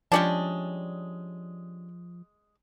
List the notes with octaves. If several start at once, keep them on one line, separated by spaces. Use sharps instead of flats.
F3 G3 G#3 C#4 D4 D5 A5